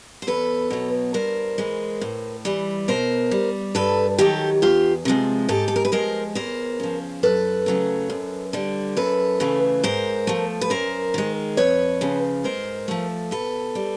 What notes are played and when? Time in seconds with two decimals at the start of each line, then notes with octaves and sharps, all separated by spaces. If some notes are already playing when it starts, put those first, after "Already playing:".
0.22 C5
0.27 E2 A4 B4
0.70 B2 F#3
1.14 G2 A#4 C5
1.58 E3 G#3
2.01 A2
2.45 E3 G3
2.88 B2 A#4 C5
3.31 G3
3.75 G2 A4 B4
4.18 D#3 F#3 G4 A4
4.62 E2 F4 G4
5.05 C3 F3 G#3
5.49 G#2 G4 A4
5.68 A4
5.76 A#4
5.85 B4
5.92 F3 G#3 A#4 C5
6.35 E2 A#4 C5
6.80 C#3 F3
7.23 F#2 A4 B4
7.66 C#3 F#3 A3
8.10 F#2
8.53 D3 G3
8.97 F#2 A4 B4
9.40 C#3 E3 A3
9.84 G#2 A#4 C5
10.27 F3 A3
10.61 B4
10.70 F#2 A#4 C5
11.14 D#3 G#3
11.57 F2 B4 C#5
12.01 C#3 F3
12.44 G#2 A#4 C5
12.88 F3 A3
13.31 B2 A4 B4
13.75 G3